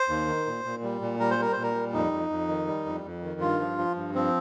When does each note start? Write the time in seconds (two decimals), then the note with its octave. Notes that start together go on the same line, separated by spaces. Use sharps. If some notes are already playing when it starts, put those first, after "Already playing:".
Already playing: C5
0.09 D#2
0.27 D#3
0.46 A#2
0.64 A#2
0.83 G3
1.01 A#2
1.19 G3 A#4
1.31 C5
1.38 G3 A#4
1.52 A#2 C5
1.63 A#4
1.75 G3
1.93 F2 D#4
2.12 F2
2.30 F2
2.48 D#3
2.67 G3
2.86 F2
3.04 F2
3.23 D#3
3.41 G2 F4
3.60 F3
3.78 F3
3.96 G2
4.15 F3 C4